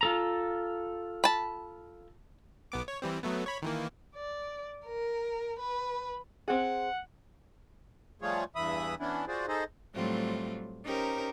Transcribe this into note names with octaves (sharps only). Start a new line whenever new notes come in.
F4 A4 A#5
A5 B5
B1 B3 D6
C#5
E3 G3 C4
F#3 A3 B3
C#5 B5
D#3 E3 A#3
D5
A#4
B4
C4 G#4 F#5
F3 G3 A3 F4 G#4 C#5
E2 G2 E3 E5 B5 D#6
E3 B3 C#4 D4 E4
F4 F#4 G#4 C5 D5
D#4 G#4 A4 C5 D#5
A2 F#3 G3 A3 C4 F4
C#4 D#4 G4 A#4 C5